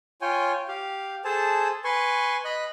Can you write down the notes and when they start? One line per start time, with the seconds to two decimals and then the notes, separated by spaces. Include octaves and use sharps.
0.21 F4 C#5 G5 G#5
0.68 G4 F5
1.25 G#4 A4 C5 A5
1.84 B4 G#5 C6 C#6
2.45 D#5 B5 F#6